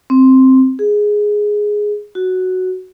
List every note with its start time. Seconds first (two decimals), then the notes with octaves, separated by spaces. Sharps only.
0.10 C4
0.79 G#4
2.15 F#4